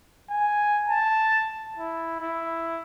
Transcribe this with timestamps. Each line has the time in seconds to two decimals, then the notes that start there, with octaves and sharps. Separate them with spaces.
0.30 G#5
0.88 A5
1.78 E4
2.21 E4